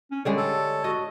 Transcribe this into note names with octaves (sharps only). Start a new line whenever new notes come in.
C#4
D3 G3 G#3 C#5
A4
F#4 D#5